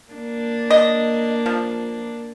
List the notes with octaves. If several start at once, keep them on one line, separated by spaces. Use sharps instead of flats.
A#3 D4
D#5
F3